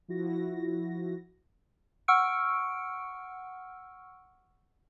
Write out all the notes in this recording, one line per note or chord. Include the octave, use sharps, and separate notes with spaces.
F3 E4 F#4 A#6
F#5 C#6 E6 F6 C#7 D7